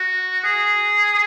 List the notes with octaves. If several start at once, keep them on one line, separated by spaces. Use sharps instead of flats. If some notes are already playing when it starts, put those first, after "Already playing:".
Already playing: F#4
G#4